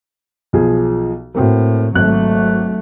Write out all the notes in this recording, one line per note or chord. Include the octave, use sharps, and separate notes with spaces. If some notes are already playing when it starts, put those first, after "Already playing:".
B1 F3 G#4
A2 A#3 C4 F#4
G#1 F#3 A3 F#6